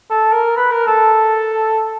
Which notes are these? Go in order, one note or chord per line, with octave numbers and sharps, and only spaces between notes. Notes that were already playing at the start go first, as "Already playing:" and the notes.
A4
A#4
B4
A#4
A4